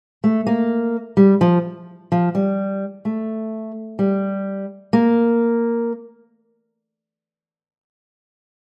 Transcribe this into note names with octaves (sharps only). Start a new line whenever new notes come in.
A3
A#3
G3
F3
F3
G3
A3
G3
A#3